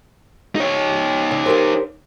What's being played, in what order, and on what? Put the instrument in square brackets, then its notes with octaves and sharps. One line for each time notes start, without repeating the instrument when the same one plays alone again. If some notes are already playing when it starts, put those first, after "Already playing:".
[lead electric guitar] D#4 C#5
[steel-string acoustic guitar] C#3
G4 A#4 C5